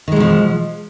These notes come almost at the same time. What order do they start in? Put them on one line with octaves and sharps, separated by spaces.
D#3 G#3 B2 F3